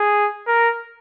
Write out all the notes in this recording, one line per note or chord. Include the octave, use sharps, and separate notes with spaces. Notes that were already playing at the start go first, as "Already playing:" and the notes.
Already playing: G#4
A#4